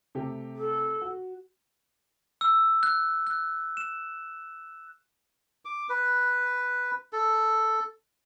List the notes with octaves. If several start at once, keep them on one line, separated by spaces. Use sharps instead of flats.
C3 A3 G4
A4
F#4
E6
F#6
F#6
E7
D6
B4
A4